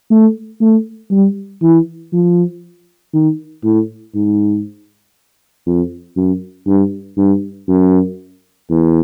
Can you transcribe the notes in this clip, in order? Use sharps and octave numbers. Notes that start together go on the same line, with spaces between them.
A3
A3
G3
E3
F3
D#3
A2
G#2
F2
F#2
G2
G2
F#2
E2